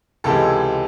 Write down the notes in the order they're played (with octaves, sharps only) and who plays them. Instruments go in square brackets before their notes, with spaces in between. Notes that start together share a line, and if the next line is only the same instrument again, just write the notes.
[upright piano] C#2 C3 E3 G#3 A4